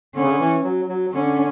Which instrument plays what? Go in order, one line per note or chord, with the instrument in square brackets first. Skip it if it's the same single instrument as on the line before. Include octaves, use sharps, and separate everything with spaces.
[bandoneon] D3 [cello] C#4
[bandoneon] C#3
D3
E3
F#3
F#3
[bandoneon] D3 [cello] C#4